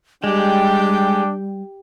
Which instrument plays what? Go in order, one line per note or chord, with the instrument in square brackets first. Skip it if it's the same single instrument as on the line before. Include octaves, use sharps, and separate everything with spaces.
[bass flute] G3 [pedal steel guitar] G#3 [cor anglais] D4 [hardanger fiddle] G4 G5